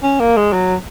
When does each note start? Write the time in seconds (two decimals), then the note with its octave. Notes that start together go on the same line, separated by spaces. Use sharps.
0.03 C#4
0.20 A#3
0.37 G#3
0.53 F#3